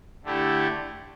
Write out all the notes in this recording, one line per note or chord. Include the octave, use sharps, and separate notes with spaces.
D3 A3 E4 G4